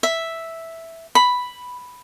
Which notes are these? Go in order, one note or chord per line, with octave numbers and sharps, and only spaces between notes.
E5
B5